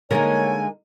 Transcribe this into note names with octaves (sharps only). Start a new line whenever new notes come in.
D3 G#3 A#3 D#4 A#4 C#5 G#5